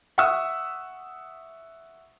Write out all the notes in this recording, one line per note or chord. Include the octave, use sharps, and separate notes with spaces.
E5 F#5 C#6 D#6 E6